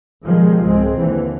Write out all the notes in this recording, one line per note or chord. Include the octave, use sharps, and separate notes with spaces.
B2 D#3 F3 G3 G#3
C2 G#2 G#3 C4
D#2 D3 E3